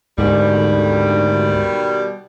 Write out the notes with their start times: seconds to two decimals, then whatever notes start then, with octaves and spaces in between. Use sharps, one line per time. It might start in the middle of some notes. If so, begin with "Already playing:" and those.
0.18 D2 G#2 B2 D#3 G3